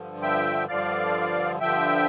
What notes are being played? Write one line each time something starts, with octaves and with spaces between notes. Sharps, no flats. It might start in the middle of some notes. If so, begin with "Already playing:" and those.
Already playing: G2 D3 F3
E5 G5
G2 D3 F3 D5 F5
G2 D3 F3 E5 G5